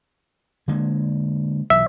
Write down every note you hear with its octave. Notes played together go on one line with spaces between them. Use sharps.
D3 G#3 A#3
B1 B2 E3 E5